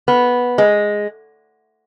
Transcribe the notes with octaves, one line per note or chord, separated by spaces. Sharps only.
B3
G#3